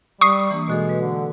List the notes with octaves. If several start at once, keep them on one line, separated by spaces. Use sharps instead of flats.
G3 C#6 D#6 C7
E3 A#3 D4
B2 G#3 F#4 A4
B4
D3